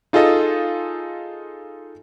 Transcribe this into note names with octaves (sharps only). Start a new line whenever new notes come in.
D#4 F4 G#4 A4 D#5